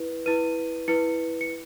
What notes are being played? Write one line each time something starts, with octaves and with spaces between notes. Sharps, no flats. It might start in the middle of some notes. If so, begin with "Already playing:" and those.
Already playing: E4 B4
E4 B4 D#7
E4 B4 C#7
C#7